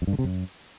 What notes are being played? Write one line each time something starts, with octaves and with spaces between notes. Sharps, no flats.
F2
G2
D3
C3
F#2